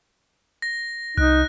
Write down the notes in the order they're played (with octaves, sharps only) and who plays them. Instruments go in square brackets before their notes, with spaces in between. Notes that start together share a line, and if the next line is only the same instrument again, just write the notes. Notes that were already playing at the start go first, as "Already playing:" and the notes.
[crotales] A#6
[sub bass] C2 [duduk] D#4 [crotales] F#6